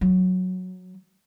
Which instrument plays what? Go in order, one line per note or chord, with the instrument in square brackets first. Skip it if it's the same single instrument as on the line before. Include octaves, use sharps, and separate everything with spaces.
[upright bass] F#3